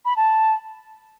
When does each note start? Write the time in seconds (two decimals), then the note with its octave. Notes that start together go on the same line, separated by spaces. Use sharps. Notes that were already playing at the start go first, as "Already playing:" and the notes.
0.05 B5
0.17 A5